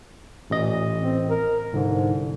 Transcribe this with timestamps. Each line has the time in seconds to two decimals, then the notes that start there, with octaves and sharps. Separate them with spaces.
0.50 A1 A#2 D#5
1.00 C4
1.30 A#4
1.73 C2 G#2 D3